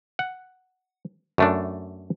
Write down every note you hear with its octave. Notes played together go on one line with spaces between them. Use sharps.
F#5
F#2 A3 D4